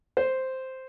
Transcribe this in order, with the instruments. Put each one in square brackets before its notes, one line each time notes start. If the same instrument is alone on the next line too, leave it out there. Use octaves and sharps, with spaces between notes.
[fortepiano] C5